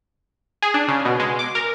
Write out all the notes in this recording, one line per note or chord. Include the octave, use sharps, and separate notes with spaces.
G#4
D4
C#3
B2
G#3
D6
A#4